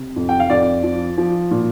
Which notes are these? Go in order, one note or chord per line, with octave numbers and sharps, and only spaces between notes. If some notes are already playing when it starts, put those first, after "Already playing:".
Already playing: C3
F2
G5
F5
F2 D5
F3
F3
A#2